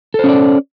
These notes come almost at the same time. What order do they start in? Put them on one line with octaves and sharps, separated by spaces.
A4 C5 C#4 D5